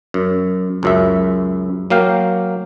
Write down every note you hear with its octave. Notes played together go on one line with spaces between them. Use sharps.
F#2
C#2 F#2 E5
F#3 A#3 F5 G5